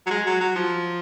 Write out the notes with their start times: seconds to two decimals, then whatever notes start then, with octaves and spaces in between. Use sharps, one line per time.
0.06 F#3
0.11 G#3
0.26 F#3
0.41 F#3
0.55 F3